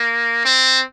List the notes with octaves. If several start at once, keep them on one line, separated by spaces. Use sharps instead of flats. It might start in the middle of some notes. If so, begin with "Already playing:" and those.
Already playing: A#3
C4